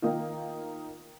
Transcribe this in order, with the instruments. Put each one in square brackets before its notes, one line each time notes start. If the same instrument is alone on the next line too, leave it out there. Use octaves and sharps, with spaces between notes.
[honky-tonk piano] D#3 A#3 D#4 F4